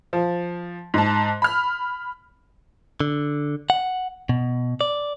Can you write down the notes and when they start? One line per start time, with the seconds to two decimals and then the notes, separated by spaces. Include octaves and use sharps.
0.13 F3
0.94 G#2 A5
1.42 B5 F6
3.00 D3
3.70 F#5
4.29 B2
4.81 D5